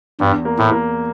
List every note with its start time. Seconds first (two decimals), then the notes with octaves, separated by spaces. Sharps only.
0.20 E2 G2
0.45 A#3
0.58 A2
0.72 A#3